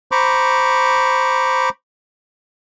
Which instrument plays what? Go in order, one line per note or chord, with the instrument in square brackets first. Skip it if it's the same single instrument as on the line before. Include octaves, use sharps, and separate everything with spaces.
[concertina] C5 A#5 B5 C#6 D6